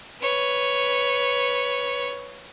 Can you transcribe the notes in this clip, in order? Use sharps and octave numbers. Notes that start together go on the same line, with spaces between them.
B4 C#5